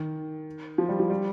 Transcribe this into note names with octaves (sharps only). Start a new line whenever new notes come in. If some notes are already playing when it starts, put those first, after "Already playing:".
Already playing: D#3
F3
G3
F3
G3